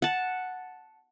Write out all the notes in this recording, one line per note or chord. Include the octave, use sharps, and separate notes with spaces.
F#5 A5